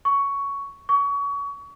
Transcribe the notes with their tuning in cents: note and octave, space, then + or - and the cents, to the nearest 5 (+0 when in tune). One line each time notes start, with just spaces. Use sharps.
C#6 +10
C#6 +30